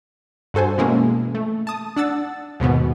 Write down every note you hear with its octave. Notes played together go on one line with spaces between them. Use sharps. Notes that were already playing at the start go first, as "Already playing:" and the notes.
G2 F#4 A4 C5 G#5
B2 E3 G#3 A#3 C#4
A3
A5 D#6
D4 F#5 E6 A6
D#2 G#2 B2 B3